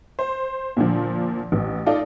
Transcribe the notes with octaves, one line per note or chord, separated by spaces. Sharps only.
C5
A#2 D3 F3
A1
D#4 F4 A4 D5